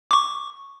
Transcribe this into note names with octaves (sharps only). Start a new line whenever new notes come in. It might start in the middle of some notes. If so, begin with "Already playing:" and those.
C#6 D6